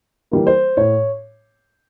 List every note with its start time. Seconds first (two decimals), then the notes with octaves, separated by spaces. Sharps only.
0.31 E3 G3 A#3
0.47 C5
0.77 A2 C#5